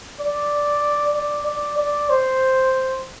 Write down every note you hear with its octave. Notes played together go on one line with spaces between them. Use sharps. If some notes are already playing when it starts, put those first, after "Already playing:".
D5
D5
D5
D5
C5